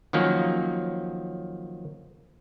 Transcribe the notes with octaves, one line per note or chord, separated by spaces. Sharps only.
D#3 F3 F#3 A#3 C#4